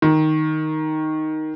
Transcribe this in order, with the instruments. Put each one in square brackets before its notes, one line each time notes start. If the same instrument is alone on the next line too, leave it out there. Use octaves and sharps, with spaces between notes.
[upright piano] D#3